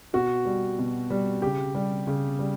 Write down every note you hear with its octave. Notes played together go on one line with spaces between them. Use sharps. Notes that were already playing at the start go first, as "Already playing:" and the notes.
B2 F#4
G3
B2
G3
C#3 G4
G3
C#3
G3